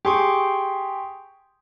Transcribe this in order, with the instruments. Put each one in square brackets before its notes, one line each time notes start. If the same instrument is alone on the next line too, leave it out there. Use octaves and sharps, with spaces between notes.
[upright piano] G4 G#4 [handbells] G5 C6 C#6